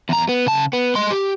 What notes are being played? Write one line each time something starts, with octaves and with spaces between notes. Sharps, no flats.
E2 A#5
B3
C#3 A5
B3
D#5 C6
G4